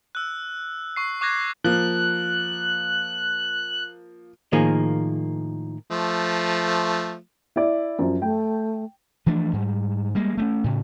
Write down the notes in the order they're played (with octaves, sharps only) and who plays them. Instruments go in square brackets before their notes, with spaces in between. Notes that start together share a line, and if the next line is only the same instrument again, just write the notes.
[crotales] E6 F#6
C#6 C7
C#6 D6 F#6 G#6 A#6
[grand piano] F3 A#3 [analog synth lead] F#6
[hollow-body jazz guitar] A2 D#3 F3 A#3 G#4
[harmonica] F3 A3
[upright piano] E4 D5
F#2 F3
[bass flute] A3 [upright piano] G5
[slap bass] E3 F3 A3 D4
G#2 G3
G3 G#3 A#3
A3 A#3 C#4
A2 C#3